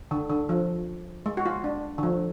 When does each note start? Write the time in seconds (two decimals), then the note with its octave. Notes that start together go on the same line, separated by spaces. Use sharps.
0.11 D3
0.30 D3
0.49 F3
1.26 G#3
1.37 F#4
1.46 F4
1.64 D4
1.98 D3
2.03 F3